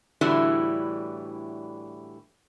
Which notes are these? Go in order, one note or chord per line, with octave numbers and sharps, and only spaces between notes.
A2 D3 E3 G3 E4 F#4